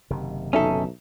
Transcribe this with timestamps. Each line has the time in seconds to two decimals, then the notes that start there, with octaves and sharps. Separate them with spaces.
0.10 F#1 C3 D#3
0.53 B1 C#4 D#4 A4 E5